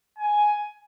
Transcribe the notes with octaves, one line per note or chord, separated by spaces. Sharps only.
G#5